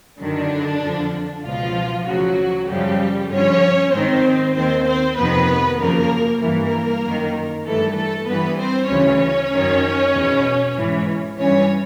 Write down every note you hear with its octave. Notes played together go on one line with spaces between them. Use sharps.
F#2 D3 D#3 D4
F2 D3 F3
C#2 B2 F3 F4
D2 C#3 F3 F#3 F#4
F#2 C#3 F3 G3 G4
G2 D3 F3 C#4 C#5
G#2 D#3 C4 C5
D#2 D#3 C4 C5
C4 C5
F2 C3 D#3 B3 B4
F#2 C#3 F3 A#3 A#4
G2 E3 A#3 A#4
F#2 D#3
G2 E3 A3 A4
A3 A4
G2 E3 B3 B4
C4 C5
D2 C#3 E3 C#4 C#5
F#2 D#3
E2 B2
G#2 E3
G2 E3 C#4 C#5